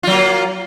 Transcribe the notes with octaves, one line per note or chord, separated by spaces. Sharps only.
F#3 A#3 F4